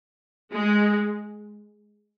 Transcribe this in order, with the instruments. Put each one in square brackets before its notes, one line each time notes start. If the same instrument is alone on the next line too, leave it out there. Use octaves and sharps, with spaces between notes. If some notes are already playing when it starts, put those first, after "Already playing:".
[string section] G#3